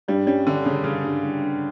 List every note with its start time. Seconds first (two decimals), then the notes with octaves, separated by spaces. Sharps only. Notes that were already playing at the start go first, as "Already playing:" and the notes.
0.08 G2 G3
0.27 G3 C#4
0.47 D3 C#4
0.65 C#3 C#4
0.84 G2 C#3
1.03 G2
1.23 G2
1.42 G2